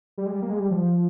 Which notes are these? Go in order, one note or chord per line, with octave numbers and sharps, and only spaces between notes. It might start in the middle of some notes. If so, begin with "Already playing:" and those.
G3
G#3
G3
A#3
G#3
G3
F3